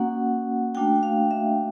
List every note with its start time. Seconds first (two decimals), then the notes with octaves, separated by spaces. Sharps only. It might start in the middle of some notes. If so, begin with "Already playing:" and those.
Already playing: A#3 C#4 F#4 F#5
0.75 A3 D4 F#4 G5
1.03 F5
1.31 E5